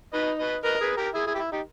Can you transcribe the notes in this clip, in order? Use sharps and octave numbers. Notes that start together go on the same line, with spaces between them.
D#4 B4 D#5
B4 D#5
A#4 B4 D#5
G#4 B4
G4 A#4
E4 G#4
E4 G#4
G4
E4
D#4 G4